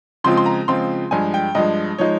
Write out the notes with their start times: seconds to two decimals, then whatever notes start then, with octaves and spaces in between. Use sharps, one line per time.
0.24 C#3 F3 G#3 C4 F4 C6
0.37 C6
0.46 A#5
0.68 C#3 F3 G#3 C4 F4 C6
1.11 G2 F3 G#3 G#5
1.34 G5
1.55 G2 F3 G#3 D#5
1.98 F3 G#3 D#4 C#5